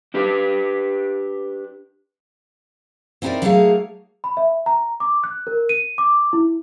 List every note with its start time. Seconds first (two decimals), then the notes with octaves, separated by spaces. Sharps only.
0.14 D4 G4 B4
3.22 C4 D#4 E4 F#4 A#4 D5
3.42 F#3 A3 A#3 D#4 G#4 F5
4.24 B5
4.37 E5
4.66 A#5
5.00 D6
5.24 F#6
5.47 A#4
5.69 D#7
5.98 D6
6.33 E4